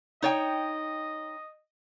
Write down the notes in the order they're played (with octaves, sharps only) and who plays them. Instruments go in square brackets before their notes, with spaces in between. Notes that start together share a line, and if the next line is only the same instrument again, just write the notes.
[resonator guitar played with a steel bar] D#4 C#5 G5 [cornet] D#5